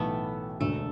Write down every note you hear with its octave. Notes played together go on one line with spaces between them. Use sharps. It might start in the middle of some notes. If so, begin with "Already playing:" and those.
Already playing: B1 A2 E3 A3 B3
E1 D2 D3 A3